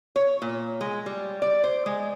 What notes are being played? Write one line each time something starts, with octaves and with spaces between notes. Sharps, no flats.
C#5
A#2
G#3
G3
D5
C5
G#3